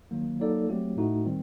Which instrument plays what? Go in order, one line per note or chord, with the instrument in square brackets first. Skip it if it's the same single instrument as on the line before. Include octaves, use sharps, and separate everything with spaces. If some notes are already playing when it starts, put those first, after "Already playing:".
[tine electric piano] D#3 F#3 A#3
F#3 A#3 D#4 A4 D5
F#3 A3 C4 G4
A2 A3 D#4 F#4
D#3 G3 C4